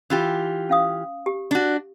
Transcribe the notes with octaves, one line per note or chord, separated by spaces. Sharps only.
E3 F4 G4
C#4 F5 D#6
G4
D4 F#4